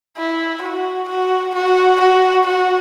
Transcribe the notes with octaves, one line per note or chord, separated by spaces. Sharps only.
E4
F#4
F#4
F#4
F#4
F#4